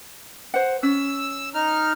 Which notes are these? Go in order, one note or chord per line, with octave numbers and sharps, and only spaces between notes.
C5 F#5
C#4 E6
D#4 F6